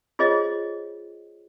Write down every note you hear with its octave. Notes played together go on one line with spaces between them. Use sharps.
F4 G#4 C5 C#5 D#5